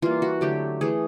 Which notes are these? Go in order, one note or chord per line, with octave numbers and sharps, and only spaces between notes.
E3 G3 A#3 F4
F#4
D3 F#3 A3 G4
E3 A3 G#4